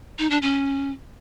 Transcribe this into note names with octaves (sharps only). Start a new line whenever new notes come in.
D#4
D4
C#4